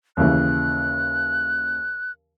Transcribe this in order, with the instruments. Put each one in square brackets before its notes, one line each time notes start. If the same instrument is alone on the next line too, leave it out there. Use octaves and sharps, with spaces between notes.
[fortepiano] D#2 C#3 E3 [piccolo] F#6